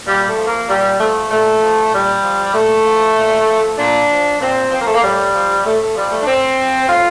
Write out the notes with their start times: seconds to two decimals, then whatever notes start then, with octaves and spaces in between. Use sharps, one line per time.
0.06 A#2 G3
0.26 A3
0.37 F3
0.47 A#3
0.68 A#2 G3
0.99 F3 A3
1.30 A#2 A3
1.62 F3
1.92 A#2 G3
2.22 F3
2.54 A#2 A3
2.85 F3
3.16 A#2
3.47 F3
3.78 A#2 D4
4.09 F3
4.40 A#2 C4
4.71 F3 C4
4.79 A#3
4.86 A3
4.94 A#3
5.02 A2 G3
5.34 F3
5.65 A2 A3
5.80 A3
5.95 F3 G3
6.11 A3
6.21 D4
6.26 A2 C4
6.58 F3
6.88 A2 F4